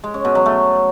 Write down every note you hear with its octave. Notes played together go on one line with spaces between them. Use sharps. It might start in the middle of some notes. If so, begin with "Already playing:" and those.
G#3
C#4
B2
F#3
A3